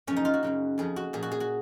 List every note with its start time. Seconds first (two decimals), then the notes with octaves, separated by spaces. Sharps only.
0.07 F#2 C#3 F3 C#4
0.16 D#4
0.25 F4
0.34 F#4
0.43 F#2 C#3 F#3
0.78 F2 C#3 F3 G#4
0.96 F#4
1.13 A#2 F3 G#4
1.23 F#4
1.32 G#4
1.40 F#4